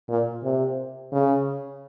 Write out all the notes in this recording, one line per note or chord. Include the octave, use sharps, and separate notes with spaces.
A#2
C3
C#3